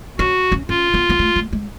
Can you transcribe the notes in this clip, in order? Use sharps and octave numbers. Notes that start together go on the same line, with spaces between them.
C#4 F#4
C#4
C#4 F4
B3
B3
A3
A3
G#3